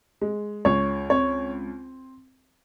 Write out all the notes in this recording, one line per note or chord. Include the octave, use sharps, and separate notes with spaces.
G#3
C#2 C#5
C4 C#5